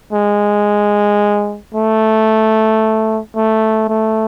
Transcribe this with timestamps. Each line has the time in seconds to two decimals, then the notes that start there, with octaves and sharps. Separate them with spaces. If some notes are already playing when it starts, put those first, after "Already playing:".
0.13 G#3
1.75 A3
3.36 A3
3.89 A3